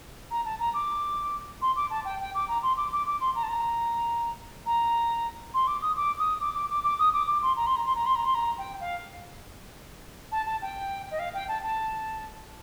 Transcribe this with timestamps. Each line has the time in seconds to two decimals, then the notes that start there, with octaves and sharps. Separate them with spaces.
0.31 A#5
0.45 A5
0.59 A#5
0.74 D6
1.62 C6
1.76 D6
1.90 A5
2.05 G5
2.20 G5
2.35 D6
2.48 A#5
2.63 C6
2.77 D6
2.92 D6
3.07 D6
3.21 C6
3.35 A#5
3.43 A5
3.49 A#5
4.66 A#5
5.54 C6
5.67 D6
5.82 D#6
5.96 D6
6.19 D#6
6.41 D6
6.55 D6
6.70 D6
6.84 D6
6.99 D#6
7.13 D6
7.27 D6
7.42 C6
7.56 A#5
7.67 C6
7.76 A#5
7.86 C6
7.95 A#5
8.06 C6
8.15 A#5
8.25 C6
8.35 A#5
8.58 G5
8.80 F5
10.32 A5
10.46 A5
10.62 G5
11.11 D#5
11.19 F5
11.34 G5
11.48 A5
11.64 A5